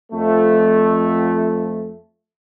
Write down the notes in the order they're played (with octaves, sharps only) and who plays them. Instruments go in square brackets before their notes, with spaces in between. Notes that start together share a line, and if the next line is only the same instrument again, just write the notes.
[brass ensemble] F2 A3